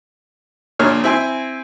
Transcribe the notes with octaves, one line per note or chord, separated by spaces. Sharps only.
A#1 A#2 D3 A#3 C#5 F6
C4 E4 G#5 C6